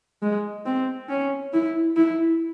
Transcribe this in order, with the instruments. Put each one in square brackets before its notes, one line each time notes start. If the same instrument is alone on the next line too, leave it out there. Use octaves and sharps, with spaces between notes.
[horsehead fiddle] G#3
C4
C#4
E4
E4